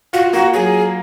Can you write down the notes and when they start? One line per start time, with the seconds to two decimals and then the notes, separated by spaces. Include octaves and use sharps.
0.13 F4 F#4
0.33 A#3 F#4
0.54 F#3 G#4